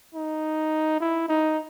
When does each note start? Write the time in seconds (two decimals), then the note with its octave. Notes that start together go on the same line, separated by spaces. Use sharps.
0.15 D#4
1.00 E4
1.29 D#4